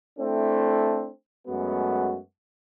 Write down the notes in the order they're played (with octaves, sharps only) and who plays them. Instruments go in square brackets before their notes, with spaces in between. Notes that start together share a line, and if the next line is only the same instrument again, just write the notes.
[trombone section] A3 C4 D4 E4 A4
F#2 G#3 A3 B3 F#4